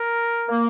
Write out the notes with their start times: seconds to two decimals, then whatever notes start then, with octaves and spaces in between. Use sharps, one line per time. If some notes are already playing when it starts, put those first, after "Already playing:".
Already playing: A#4
0.49 A#3